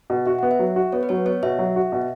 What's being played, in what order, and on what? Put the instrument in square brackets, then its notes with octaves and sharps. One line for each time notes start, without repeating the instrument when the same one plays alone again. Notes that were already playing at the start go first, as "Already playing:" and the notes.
[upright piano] B2
[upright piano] F#4 [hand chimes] E5
[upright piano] B3 [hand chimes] F#5
[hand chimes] E5
[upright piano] F#3
F#4
[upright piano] B3 [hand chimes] C#5
[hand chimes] B4
[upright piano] F#3 [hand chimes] C#5
[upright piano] B3 [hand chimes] C#5
[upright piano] B2 [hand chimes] E5
[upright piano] F#3
F#4
B2